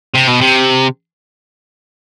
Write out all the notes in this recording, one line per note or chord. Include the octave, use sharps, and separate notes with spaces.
C3
B2
C3